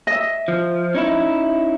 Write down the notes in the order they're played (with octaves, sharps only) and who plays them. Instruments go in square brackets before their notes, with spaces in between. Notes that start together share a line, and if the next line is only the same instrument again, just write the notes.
[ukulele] D#5 E5
[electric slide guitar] F3
C#4 D#4 E4